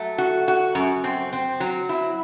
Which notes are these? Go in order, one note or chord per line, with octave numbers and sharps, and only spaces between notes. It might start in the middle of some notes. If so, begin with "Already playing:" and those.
Already playing: F#3 A3
F#4
F#4
F#2
C4
C4
F#3
E4